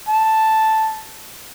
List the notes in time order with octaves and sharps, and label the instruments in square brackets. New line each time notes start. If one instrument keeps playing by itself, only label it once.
[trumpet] A5